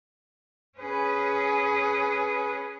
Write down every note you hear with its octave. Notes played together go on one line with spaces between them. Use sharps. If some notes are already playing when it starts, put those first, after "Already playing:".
C#4 G#4 B4